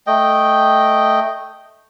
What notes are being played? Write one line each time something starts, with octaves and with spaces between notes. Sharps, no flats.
A3 D#5 G5